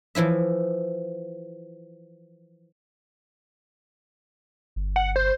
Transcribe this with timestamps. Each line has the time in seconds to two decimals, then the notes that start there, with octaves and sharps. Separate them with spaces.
0.15 E3 F3 E4 E5
4.76 G1
4.96 F#5
5.16 C5